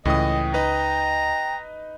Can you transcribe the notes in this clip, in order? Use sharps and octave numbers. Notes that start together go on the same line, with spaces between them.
C#2 A2 E3 D#5 G5 D#6
D#4 B4 D#5 A#5